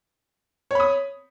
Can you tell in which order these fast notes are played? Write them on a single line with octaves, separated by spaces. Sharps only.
C#5 B5 D#6